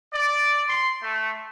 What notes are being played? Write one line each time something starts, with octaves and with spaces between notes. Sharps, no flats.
D5
C6
A3